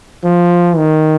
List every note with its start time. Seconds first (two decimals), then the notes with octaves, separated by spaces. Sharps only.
0.24 F3
0.77 D#3